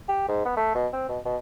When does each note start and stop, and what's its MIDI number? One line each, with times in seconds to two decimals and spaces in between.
0.08 0.23 67
0.28 0.45 44
0.45 0.52 59
0.57 0.71 57
0.75 0.87 47
0.93 1.07 60
1.09 1.19 47
1.25 1.36 47